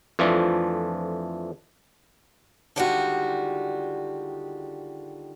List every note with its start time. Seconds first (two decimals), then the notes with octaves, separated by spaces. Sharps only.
0.19 F2 E3 F3 A3 D4
2.76 D3 D#3 G3 G#3 F4 F#4